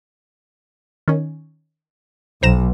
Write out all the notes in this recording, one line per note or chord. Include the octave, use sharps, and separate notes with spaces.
D#3 C#4
B1 C5 A#5 E7